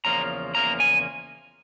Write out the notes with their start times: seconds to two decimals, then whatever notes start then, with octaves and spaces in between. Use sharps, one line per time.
0.05 E2 C#3 F3 A#3 A#5
0.55 E2 C#3 F3 A#3 A#5
0.80 G#5